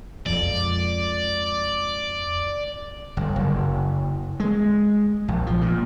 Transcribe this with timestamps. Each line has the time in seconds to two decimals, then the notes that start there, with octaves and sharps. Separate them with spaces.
0.26 F2 G#3 D5
3.17 G1
3.36 F#1
4.40 G#3
5.28 A#1
5.47 F3
5.62 A#2